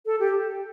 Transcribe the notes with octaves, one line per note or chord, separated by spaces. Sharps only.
A4
G4